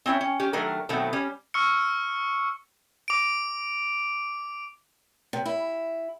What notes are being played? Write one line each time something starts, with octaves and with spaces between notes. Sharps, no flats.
C4 C#4 E4 C#5
C#4
C#4 G4
D#3 F#3 A3 D4 A#4
B2 D#3 F#3 A3 B3 C4
G3 C#4
C#6 E6 F6 C#7
D6 D7
C3
E4